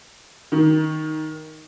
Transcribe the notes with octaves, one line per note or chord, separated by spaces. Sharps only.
D#3